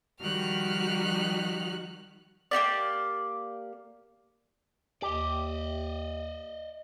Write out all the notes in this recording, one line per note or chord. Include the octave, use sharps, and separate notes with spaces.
D#3 F3 G3 F#4 F6 F#6
A#3 D#4 G4 D5
D#2 G4 D5 D#5